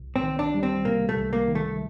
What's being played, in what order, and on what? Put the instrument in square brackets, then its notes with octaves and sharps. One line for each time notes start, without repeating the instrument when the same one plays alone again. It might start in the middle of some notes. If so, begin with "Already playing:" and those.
Already playing: [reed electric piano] C2
[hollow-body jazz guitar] C4
[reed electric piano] D#3
[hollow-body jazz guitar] D4
[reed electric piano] G3
[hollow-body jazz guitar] C4
[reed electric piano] C3 [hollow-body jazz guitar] A#3
[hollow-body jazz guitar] A3
[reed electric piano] C2
[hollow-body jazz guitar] A#3
[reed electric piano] D#3
[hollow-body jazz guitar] A3